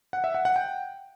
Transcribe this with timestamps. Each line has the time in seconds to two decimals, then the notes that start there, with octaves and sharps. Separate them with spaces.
0.13 F#5
0.24 E5
0.34 F#5
0.45 F#5
0.56 G5